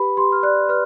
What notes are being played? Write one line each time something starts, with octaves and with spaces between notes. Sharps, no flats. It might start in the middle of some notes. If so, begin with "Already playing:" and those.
Already playing: G4 B4 B5
G4 C6
F6
D5 F#6
B4 F6